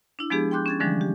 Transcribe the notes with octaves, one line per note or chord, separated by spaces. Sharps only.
D4 E4
F3 G#3 B3 D4 G4 G#4
G5 C6 D6 F#6 G6
C#4 G#6 A6
D3 E3 F3 G3 G#3 D4
G4